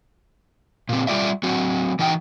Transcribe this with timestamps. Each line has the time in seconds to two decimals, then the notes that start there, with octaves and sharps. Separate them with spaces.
0.89 A#2 C4
1.07 G3 F4 D5 E5
1.43 F#3 C4 F#4
1.99 E3 D#4 F#4 G5